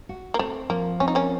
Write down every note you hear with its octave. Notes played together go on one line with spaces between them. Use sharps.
F#4
A#3
A3 C4
F3 A#3
C4 C#4
D#4
A#3 C#4